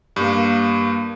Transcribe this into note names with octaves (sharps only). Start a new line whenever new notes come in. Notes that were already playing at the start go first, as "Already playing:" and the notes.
G2 A#3